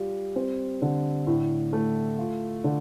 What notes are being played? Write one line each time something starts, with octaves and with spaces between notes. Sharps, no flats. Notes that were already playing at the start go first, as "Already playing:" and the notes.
Already playing: G3 F4
C4
D3
A2
A3
F4
D3